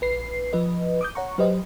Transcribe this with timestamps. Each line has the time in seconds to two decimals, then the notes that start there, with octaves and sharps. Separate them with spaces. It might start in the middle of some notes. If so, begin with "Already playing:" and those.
0.01 A#1 B4 C7
0.53 F3 B4 D#5
1.01 D6 D#6 G6
1.15 C#5 F#5 A#5 C#6
1.38 F#3 G4 B4 C5 D#5